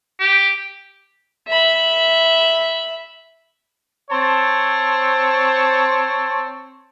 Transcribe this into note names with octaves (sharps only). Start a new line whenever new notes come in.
G4
E5 B5
C4 C5 C#5 A5